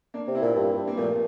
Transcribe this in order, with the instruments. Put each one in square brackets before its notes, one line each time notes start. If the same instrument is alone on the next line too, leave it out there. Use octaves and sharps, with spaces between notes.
[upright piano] A#3 D4
[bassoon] C3
[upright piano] C4 E4
[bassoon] A#2
G2
G2
[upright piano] A#3
[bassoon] A#2 [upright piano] F3 A3